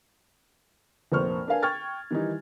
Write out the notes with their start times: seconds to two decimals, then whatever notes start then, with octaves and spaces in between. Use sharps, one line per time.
1.12 F1 A#1 A#3 C5 C#6 F6
1.47 D4 A#4 B4 F5 G#5
1.63 G5 C#6 F6 G#6 A6
2.11 D#3 E3 G3 D#4